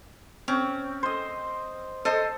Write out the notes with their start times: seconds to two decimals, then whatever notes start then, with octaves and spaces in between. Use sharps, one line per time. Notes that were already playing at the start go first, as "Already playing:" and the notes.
0.48 C4 C#4
1.03 C5 D#5
2.05 A4 C5 D#5